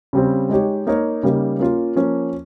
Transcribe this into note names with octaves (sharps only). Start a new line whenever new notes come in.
C#3 G3 C4
G#3 D#4 G4 C#5
A#3 D#4 A#4 C#5
C#3 G3 A#3 D#4
A#3 C#4 F4
F3 A#3 C#4